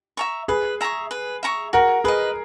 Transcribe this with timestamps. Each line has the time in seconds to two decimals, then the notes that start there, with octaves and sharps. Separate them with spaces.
0.17 E5 A#5 C#6
0.48 G#4 B4
0.81 E5 A#5 C#6
1.11 B4
1.43 E5 A#5 C#6
1.73 F#4 A#4
2.04 G#4 B4 D#5